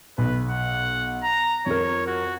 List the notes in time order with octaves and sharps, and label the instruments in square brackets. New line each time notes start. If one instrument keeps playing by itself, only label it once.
[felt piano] B1 [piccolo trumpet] B4
[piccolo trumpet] F#5
A#5
[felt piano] F2 A#4 [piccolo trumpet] C#5
[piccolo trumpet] F#4